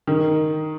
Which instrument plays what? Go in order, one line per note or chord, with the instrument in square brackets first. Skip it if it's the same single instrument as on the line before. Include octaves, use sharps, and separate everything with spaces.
[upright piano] D#3